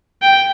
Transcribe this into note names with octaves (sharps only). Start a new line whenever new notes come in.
G5